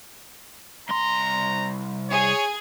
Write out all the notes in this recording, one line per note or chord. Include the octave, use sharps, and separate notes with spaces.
C2 A#5 C6
G#4 C#5